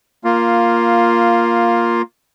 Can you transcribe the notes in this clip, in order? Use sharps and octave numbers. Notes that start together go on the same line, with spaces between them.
A#3 F4